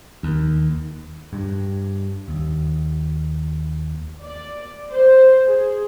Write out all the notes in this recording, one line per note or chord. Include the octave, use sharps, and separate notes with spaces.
D#2
G2
D#2
D5
C5
G#4